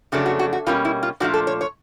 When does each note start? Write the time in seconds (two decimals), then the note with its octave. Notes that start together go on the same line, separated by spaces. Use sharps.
0.12 F2 C#3 F#3 A3 D4 F#4
0.26 F#4
0.39 F#4
0.53 F#4
0.66 B2 G3 A#3 C#4 F4
0.85 E4
1.03 F4
1.20 A#2 F3 A3 D4 F#4
1.34 A4
1.47 C#5
1.61 C#5